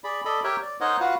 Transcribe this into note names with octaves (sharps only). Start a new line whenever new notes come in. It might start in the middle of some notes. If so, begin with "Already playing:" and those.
G#4 D5 B5
A4 D5 D#5 B5
G4 A#4 C#5 E5 G5
D5
D#4 A#4 C5 C#5 D#5 F#5
F4 F#4 B4 F5 F#5